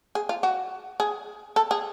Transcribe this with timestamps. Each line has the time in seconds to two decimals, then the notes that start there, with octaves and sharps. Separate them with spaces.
0.15 G#4
0.29 F4
0.43 F#4
1.00 G#4
1.56 A4
1.71 G#4